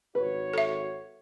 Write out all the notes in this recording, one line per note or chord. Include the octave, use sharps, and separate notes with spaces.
G#1 F#4 B4 C#5
A4 E5